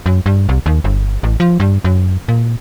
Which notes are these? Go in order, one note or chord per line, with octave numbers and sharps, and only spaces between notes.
F#2
G2
C2
D#2
G1
A1
F3
G2
F#2
A#2